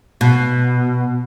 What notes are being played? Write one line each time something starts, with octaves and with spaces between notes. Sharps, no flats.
B2